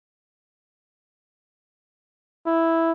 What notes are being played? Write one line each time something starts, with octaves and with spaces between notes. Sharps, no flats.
E4